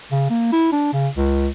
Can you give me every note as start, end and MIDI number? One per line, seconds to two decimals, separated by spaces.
0.12 0.26 49
0.30 0.49 58
0.53 0.68 64
0.73 0.93 62
0.94 1.08 49
1.17 1.47 37